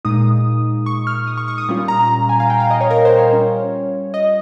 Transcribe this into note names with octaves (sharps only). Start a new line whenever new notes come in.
A#2 G#3 D#4 D#6
C#6
F6
D#6
C#6
C#6
D#6
A#2 G3 C#4 F4
A#5
G#5
F5
G5
F5
D#5
C#5
A#4
C5
C#5
G3 C#4 F4
D#5